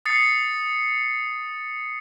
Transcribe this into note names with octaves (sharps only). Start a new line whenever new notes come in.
D#6 A6 C7 C#7